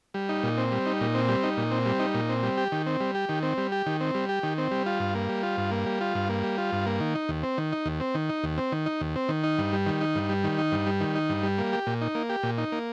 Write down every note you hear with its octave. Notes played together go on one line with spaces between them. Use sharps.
G3
D#4
A#2
C4
G3
D#4
A#2
C4
G3
D#4
A#2
C4
G3
D#4
A#2
C4
G3
G4
D#3
C4
G3
G4
D#3
C4
G3
G4
D#3
C4
G3
G4
D#3
C4
G3
F4
G2
A#3
G3
F4
G2
A#3
G3
F4
G2
A#3
G3
F4
G2
A#3
D#3
D#4
D#2
C4
D#3
D#4
D#2
C4
D#3
D#4
D#2
C4
D#3
D#4
D#2
C4
D#3
D#4
G2
G3
D#3
D#4
G2
G3
D#3
D#4
G2
G3
D#3
D#4
G2
G3
A#3
G4
A#2
D#4
A#3
G4
A#2
D#4
A#3